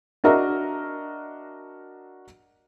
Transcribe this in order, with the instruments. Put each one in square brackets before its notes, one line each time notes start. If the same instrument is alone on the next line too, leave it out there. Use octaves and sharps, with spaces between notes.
[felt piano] D4 F#4 A#4 D#5 E5 A#5